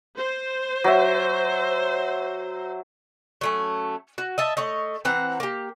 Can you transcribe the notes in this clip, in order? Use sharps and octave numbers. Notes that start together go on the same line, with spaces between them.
C5
F#3 E5
F#3 A3 C#4
F#4
D#5 E5 A5
A3 C#5 D#5
E3 C4 F#5 A#5
A#3 G4